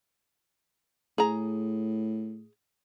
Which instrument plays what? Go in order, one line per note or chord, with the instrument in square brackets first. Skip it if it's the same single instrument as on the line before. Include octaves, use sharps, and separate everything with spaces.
[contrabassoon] A2 [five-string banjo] G#4 A#5